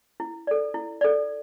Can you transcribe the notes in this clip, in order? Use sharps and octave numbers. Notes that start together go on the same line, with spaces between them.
E4
A4 D5
E4
A4 D5